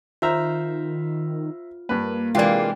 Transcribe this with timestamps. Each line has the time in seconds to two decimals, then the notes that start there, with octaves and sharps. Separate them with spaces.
0.22 D#3 F4 C5 E5 A#5 F6
1.89 G2 A#3 B4
2.35 C3 E3 G#3 A#3 D4 F4 G5